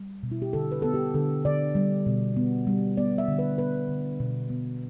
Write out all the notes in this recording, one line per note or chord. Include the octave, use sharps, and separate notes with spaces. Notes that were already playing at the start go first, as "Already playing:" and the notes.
Already playing: G3
B2
E4
G4
D3 A4
B4
B3 A4
G4
D3 A4
D3 D5
G3
B2
B3
G3
B3 D5
E5
D3
B4
B3 B4
D3
B2
B3